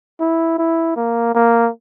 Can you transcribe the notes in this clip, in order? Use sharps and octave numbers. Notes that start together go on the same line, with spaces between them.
E4
E4
A#3
A#3